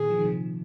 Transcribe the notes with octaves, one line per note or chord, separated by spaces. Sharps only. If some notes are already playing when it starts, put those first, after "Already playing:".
Already playing: A#2 D#3 G#4
F3
D#3
C3 F3